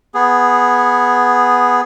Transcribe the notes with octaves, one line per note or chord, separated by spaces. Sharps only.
B3 G#4